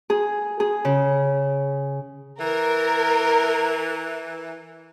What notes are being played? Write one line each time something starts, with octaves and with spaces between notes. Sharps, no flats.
G#4
G#4
C#3
E3 A#4